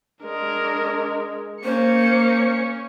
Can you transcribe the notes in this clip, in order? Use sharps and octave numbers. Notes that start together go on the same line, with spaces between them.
G#3 D4 A#4
A#3 C#4 C5 C#7